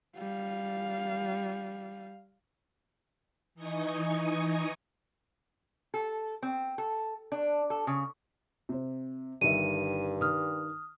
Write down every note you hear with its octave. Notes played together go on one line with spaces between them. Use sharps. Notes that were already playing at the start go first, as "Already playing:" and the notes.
G3 F5
E3 D#4 D#5 G#5 C#6 D#6
A4
C4
A4
D4
A4
C#3
C3 C5
G1 G2 D#3 E5 D#7
D#3 D#6 F6